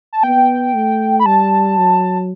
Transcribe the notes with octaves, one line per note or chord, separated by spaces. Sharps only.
A5
B3 G5
A3
B5
G3 A5
F#3